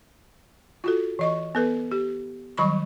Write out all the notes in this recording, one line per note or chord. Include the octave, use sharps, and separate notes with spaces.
F4 F#4 A4
E3 D#5 C#6
B3 A4 B4
G4
D#3 F#3 G3 B5 C#6